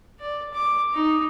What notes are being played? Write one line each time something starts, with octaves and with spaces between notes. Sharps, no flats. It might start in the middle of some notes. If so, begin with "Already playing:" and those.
D5
D6
D#4